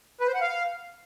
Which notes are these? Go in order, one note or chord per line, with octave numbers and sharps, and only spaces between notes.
B4
C5
F#5
F5